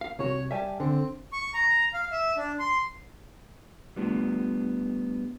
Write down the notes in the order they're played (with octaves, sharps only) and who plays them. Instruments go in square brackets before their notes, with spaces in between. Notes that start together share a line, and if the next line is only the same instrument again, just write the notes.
[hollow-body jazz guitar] F5
[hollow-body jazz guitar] C2 F#4 [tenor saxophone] C#5
[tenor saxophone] G3 [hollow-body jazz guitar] E5 G#5 A5
[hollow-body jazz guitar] D3 [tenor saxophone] C4
[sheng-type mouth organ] C#6
A#5
F5
E5
D4
C6
[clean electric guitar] G3 A3 B3 D4 F4